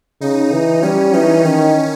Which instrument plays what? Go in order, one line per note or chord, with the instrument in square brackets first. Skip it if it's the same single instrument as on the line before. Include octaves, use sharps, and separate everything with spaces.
[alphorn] C#3 [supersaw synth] D#4
[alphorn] E3
[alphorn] G3 [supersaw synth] C#4
[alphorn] E3 [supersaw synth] D#4
[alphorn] D#3 [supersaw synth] C#4